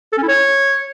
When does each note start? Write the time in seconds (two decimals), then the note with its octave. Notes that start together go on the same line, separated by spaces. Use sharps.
0.13 A4
0.18 C#4
0.23 E4
0.28 C#5